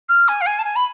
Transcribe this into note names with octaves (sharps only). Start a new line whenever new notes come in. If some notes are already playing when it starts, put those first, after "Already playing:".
F6
G#5
F5
G#5
A5
G#5
B5